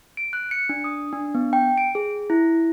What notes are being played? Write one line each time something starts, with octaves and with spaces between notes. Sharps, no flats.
D7
F#6
C#7
D4
D#6
D4
B3
G5
D7
G#4
E4